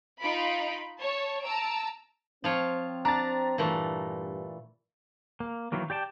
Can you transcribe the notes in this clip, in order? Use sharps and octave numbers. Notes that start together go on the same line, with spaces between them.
D#4 F4 B5 D7
C#5 A5
A5 A#5 E6 D7
F3 C4 F4 C#5
D4 A#5 A6
G2 A#2 E3 A3
A#3
D#3 E3 F#3 A#3
G4 D5 G5 A5